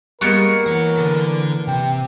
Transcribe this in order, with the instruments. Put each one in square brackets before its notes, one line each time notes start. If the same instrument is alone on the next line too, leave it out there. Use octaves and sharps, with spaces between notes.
[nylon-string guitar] G3 G#3 [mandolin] A#3 B3 C#6 [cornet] A#4
[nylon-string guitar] E3 [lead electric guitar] C#5 F#5
[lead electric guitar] D3 A4
[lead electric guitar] C3 [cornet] G5